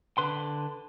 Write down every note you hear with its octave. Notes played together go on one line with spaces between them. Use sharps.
D3 B4 C6